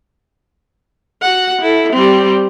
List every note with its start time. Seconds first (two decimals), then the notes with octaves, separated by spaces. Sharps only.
1.22 F#4 F#5
1.61 E4 A4
1.92 G3 C4